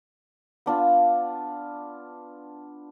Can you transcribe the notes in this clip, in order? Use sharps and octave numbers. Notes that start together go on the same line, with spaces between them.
B3 D4 F4